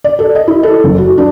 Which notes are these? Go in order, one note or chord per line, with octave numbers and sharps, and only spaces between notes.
D5
A4
D#5
E4
A4
F#1
F#4
D4